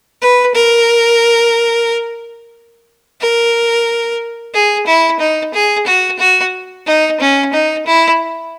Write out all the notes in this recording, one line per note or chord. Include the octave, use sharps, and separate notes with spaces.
B4
A#4
A#4
G#4
E4
D#4
G#4
F#4
F#4
D#4
C#4
D#4
E4